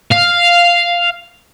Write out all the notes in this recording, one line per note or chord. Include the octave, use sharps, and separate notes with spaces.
F5